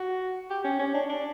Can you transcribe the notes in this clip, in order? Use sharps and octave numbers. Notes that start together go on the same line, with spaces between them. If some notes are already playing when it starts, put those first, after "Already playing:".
Already playing: F#4
G4
C#4
C#4
D4
D4